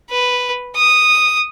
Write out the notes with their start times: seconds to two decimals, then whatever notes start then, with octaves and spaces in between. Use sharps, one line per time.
0.10 B4
0.76 D#6